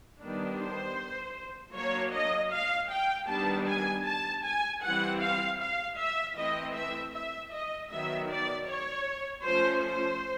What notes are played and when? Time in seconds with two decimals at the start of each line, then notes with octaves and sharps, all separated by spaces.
0.20 D#3 G3 B3 D4
0.58 C5
1.74 F#3 A#3 D4 C#5
2.13 D#5
2.52 F5
2.90 G5
3.28 D#3 G3 B3 D4 A5
3.67 G#5
4.06 A5
4.44 G#5
4.82 E3 G3 C4 F#5
5.21 F5
5.60 F5
5.99 E5
6.36 E3 A3 C4 D#5
6.75 E5
7.14 E5
7.53 D#5
7.91 D#3 F#3 B3 E5
8.29 D5
8.68 C#5
9.45 F3 A3 C#4 C5
9.84 C5